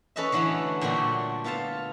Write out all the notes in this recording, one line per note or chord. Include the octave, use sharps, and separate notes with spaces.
C#4 A4 B4 D#5 E5
D3 E3 F#3 A3 D4 E4
A#2 D3 G3 A3 F#4
B3 F4 A4 F5 A5